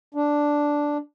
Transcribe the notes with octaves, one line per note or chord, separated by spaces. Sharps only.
D4